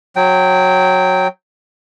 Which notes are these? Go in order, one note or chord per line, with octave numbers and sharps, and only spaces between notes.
F#3 G5